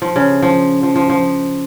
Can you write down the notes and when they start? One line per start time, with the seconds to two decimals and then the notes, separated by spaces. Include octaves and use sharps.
0.02 F3
0.16 C#3
0.42 F3
0.83 F3
0.96 F3
1.10 F3